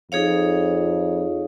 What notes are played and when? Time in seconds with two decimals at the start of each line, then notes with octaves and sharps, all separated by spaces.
0.12 F2 D#4 G#4 C#5 F5